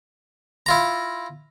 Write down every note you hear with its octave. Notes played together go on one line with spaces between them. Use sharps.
E4 F4 A#5